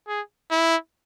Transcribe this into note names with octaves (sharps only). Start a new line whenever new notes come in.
G#4
E4